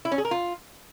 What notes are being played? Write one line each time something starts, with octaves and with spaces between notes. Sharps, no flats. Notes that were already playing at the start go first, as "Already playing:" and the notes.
E4
C#4
G#4
A#4
F4